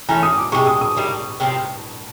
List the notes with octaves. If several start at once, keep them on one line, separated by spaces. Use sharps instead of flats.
E3 A3 C#4 A#5
D#6
D6
C3 E3 G#3 C#6
D#6
D#6
G3 A#3 D#4
C3 F3 A3 C4